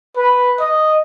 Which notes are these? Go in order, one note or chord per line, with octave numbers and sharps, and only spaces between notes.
B4
D#5